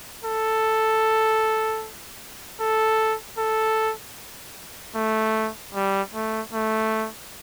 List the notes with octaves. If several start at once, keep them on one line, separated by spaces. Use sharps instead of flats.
A4
A4
A4
A3
G3
A3
A3